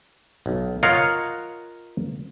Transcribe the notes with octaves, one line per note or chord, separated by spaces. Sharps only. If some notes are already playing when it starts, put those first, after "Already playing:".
B1
F4 A#4 C#5 D#5 F5 F#5